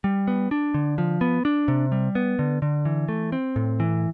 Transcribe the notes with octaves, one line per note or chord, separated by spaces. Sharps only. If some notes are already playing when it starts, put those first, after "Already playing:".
G3
B3
D4
D3
F3
B3
D4
C3
G3
B3
D3
D3
E3
A3
C4
A2
E3